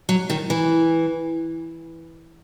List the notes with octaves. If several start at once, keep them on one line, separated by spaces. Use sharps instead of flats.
F#3
D#3
E3